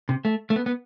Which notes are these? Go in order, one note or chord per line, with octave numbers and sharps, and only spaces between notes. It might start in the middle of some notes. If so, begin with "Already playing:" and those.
C3
A3
A3
B3
B3